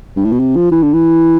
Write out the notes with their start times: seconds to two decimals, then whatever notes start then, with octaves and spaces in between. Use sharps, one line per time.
0.16 G2
0.25 A2
0.32 B2
0.39 C3
0.56 F3
0.72 E3
0.83 D3
0.94 E3